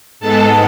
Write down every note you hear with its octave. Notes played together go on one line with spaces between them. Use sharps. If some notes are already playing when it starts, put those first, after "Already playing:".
G#2 G#3 B3 A4 A5